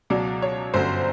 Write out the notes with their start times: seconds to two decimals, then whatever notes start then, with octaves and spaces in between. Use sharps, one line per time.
0.10 C#2 B2 F#3 D5
0.42 C#5
0.74 G1 F#2 D3 F#3 C5